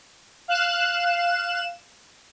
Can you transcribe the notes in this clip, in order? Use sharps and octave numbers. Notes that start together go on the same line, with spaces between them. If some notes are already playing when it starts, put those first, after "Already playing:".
F5 F#6 E7